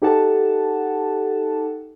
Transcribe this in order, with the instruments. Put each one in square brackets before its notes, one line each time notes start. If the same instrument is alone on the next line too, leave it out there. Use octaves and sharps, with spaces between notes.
[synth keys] D#4 G4 A4 F#5 A5